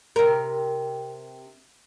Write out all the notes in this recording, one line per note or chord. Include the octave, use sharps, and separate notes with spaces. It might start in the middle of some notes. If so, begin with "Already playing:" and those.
C3 A#4